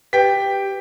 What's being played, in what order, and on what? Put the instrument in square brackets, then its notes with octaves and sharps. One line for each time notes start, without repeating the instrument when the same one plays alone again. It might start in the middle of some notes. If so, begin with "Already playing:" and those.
[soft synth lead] G4 [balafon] B4 [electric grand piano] G5 B6